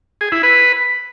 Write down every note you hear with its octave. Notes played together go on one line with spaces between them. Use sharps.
G#4
E4
B4